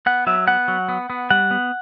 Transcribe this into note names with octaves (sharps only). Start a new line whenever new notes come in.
B3 F#5
F#3 E5
B3 F#5
F#3
B3
B3
G3 F#5
B3